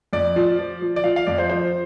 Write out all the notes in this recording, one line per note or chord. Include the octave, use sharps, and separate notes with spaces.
F2 D5
F3
F3
F3
D5
F3 F5
F5
F2 D5
C5
F3 C5